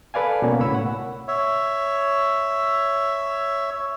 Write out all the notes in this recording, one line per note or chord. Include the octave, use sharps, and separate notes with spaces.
A4 B4 D5 F5 G#5
B2 A#3 C#4 F#4
C#2 A2 C#5 B5 E6
F#5
C#5 E5